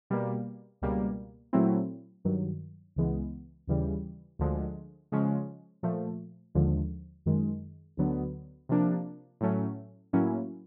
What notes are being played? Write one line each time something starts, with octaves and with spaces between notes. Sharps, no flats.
B2 G3 A#3
C#2 B2 G3 A#3
A#2 F#3 A3 C4 E4
G2 D#3 F#3
C#2 C#3 E3 G#3 B3
D#2 C#3 E3 G3
D2 D3 F3 G#3
C#3 F3 G#3 C#4
A#2 F3 A3
D#2 D3 F3 G#3
F#2 D#3 G#3
D2 D3 F#3 B3
C3 F3 A#3 D4
A2 F#3 A3 C#4
A2 F#3 A#3 C#4 E4